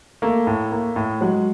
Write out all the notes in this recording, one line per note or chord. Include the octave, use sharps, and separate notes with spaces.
A3 A#3
A2
A#3
A2
F#3 G#3